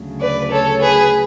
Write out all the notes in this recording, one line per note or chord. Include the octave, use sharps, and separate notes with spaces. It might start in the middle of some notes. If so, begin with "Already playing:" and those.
Already playing: D2 C#3 F#3
B4 D5
A4 C#5
G#4 B4